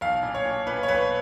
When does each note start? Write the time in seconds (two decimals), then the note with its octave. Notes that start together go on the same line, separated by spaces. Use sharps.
0.01 B1 F5
0.23 A#2
0.34 C#5
0.45 A#2
0.66 A#2 B4
0.83 C#5
0.88 B1 B4